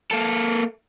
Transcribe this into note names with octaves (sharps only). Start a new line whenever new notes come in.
A#3 A4